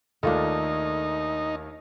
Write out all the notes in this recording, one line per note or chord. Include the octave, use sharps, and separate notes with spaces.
D#2 A3 A#3 D4 D#4 F4 A4